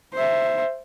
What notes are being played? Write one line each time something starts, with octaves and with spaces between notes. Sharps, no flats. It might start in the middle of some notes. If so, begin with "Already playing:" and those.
C5 E5